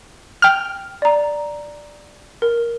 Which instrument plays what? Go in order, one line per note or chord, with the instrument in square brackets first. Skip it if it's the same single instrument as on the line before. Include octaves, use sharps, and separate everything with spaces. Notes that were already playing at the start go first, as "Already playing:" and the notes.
[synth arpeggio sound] G5 F6
[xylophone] D5 A#5
A#4